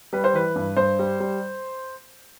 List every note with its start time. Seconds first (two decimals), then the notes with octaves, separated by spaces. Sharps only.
0.13 G3 B4
0.24 C5
0.34 E3 B4
0.56 G2
0.77 G2 C5
0.99 G3
1.20 G3